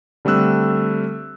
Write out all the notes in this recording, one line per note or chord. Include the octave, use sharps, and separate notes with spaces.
D3 G3 A3 C4 E6 F#6